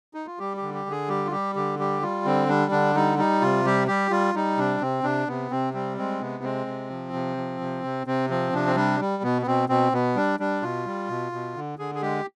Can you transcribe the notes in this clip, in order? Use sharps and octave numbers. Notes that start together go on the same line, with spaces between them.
D#4
F4
G3 G4
G4
D3
G4
D3 G#4
G3 G4
F4
G3 G4
D3 G4
G3 G4
G3 F4
D3 C4
G3 D4
D3 D4
G3 D#4
G3 D#4
C3 F4
G3 G4
G3 G4
G3 F4
G3 D#4
C3 D4
C3 C4
C3 D4
C3 B3
C3 C4
G3 C4
G#3 C4
C3 B3
G#3 C4
C3
F3
C3
F3
C3
C3
C3 C4
F3 C4
C3 D4
C4
G3 D4
G3
B2 B3
B3
B2 C4
B2 C4
B2 B3
G3 D4
G3 D4
B2 F4
G3
B2
B2
D3
D3 G#4
G#4
G#3 G4